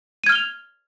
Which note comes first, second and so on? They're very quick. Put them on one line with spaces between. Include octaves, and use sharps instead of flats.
D#7 G#6 F6 G7 F7